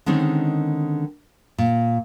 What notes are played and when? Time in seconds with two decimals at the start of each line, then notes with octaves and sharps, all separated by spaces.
0.06 D3 D#3 G#3 C4 C#4 D#4
1.58 A#2